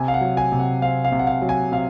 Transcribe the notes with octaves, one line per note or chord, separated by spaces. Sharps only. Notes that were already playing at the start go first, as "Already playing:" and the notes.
Already playing: C3 G#5
F5
F#5
F#3
G#5
C3
F#5
C4 F5
F5
C3
F#5
F5
F#3
G#5
C3 F5